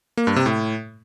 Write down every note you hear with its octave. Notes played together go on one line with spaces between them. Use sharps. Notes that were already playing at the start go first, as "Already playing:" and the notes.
A#3
G2
C3
A2